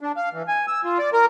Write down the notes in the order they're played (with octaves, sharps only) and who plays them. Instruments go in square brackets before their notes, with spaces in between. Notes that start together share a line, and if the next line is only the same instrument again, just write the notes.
[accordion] D4
F5
E3
G#5
E6
F4
D5
A#4